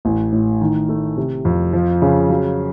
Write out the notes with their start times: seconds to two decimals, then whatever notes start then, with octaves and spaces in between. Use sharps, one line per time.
0.05 A1
0.32 A2
0.61 D#3
0.89 A3
1.17 C3
1.45 F2
1.73 F3
2.02 C#3
2.30 F#3